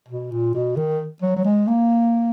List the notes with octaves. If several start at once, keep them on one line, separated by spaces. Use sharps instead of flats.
B2
A#2
B2
D#3
F#3
F#3
G#3
A#3